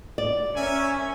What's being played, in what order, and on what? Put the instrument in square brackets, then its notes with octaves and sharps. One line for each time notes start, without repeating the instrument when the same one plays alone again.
[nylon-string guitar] D5
[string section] C#4 [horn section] A#4 E5 G#5